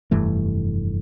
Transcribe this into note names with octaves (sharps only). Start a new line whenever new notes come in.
F1 G2 E3 A3